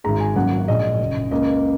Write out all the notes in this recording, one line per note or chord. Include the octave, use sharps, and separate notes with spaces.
G#1 G#2 G#3 A#5
G#5
G#1 F#2 C#3 F#3 A#3 F#5
A#1 A#2 G#3 D#5
F#1 F#2 C#3
C#2 C#3 A#3 D#5